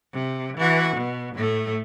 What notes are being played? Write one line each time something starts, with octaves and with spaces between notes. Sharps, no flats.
C3
E3 F#4
B2
A2 A3